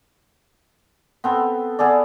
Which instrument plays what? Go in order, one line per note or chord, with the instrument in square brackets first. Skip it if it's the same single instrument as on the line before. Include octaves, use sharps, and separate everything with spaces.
[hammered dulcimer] B3 C4 A4
B3 G#4 A4 D5